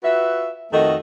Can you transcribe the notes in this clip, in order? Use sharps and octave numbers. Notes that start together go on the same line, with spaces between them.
F4 F#4 B4 E5
F2 D#3 A3 F#4 A4 D#5